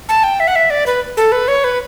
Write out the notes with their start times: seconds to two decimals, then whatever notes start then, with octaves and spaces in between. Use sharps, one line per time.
0.09 A5
0.24 G5
0.40 E5
0.48 F#5
0.56 E5
0.70 D5
0.86 B4
1.17 A4
1.32 B4
1.48 C#5
1.64 B4